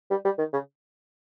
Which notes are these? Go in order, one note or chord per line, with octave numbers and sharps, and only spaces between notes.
G3
G3
D#3
C#3